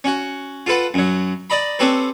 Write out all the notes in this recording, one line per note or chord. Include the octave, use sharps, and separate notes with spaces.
C#4 F#4
F4 A4 B4 F#5
F#2 F#3
D5 D#5 A#5 B5
C4 C#4 G4 A4 B4